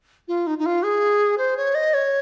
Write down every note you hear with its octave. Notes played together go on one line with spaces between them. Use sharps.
F4
D#4
D#4
F4
G#4
C5
C#5
D#5
C#5